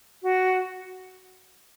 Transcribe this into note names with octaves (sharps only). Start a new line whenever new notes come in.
F#4